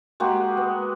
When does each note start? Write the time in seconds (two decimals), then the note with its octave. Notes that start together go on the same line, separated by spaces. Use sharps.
0.20 G#3 A#3 F#4 G4
0.57 B3